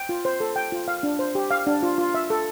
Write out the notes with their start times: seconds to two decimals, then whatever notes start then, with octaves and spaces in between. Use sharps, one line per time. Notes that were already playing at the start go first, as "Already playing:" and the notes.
Already playing: G5
0.09 F4
0.25 C5
0.40 A4
0.56 G5
0.72 F4
0.88 F5
1.03 D4
1.19 C5
1.35 G4
1.51 F5
1.66 D4
1.83 F4
1.98 F4
2.14 E5
2.30 A4